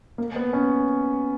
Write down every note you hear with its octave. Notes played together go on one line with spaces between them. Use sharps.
A#3
B3
C#4